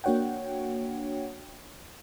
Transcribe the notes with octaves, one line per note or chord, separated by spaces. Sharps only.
A#3 D4 F#4 C#5 F#5 G5